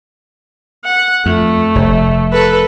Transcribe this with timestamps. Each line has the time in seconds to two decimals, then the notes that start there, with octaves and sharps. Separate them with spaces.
0.85 F#5
1.26 F2 A3
1.75 F1
2.32 A4 B4